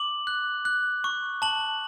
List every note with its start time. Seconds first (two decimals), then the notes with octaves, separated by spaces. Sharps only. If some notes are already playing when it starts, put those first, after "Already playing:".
Already playing: D6 F#7
0.27 F#6
0.65 F#6
1.04 C#6
1.42 A5 F#7